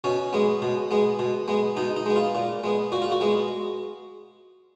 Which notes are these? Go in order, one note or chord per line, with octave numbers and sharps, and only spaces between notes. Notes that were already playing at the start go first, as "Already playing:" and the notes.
B2 C#4
G#3 B3
B2
G#3 B3
B2
G#3 B3
B2 D#4
D#4
G#3 B3
F4
A#2
G#3 B3
A#2 F#4
F4
F#4
G#3 B3